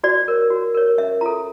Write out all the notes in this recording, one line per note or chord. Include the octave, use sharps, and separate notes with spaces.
F#4 D5
A#4 C#5
F#4
A#4 C#5
C#4 E5
F4 A4 A#5